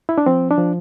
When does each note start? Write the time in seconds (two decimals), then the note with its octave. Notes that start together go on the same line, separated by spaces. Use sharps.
0.09 E4
0.18 D4
0.26 F3 C4
0.51 D4
0.58 F3